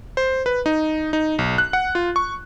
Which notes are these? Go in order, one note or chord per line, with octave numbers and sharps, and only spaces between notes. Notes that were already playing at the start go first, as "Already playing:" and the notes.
C5
B4
D#4
D#4
B1
F#6
F#5
F4
C#6